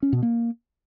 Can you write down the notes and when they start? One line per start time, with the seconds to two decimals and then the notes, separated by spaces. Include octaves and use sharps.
0.03 C#4
0.13 B2
0.23 A#3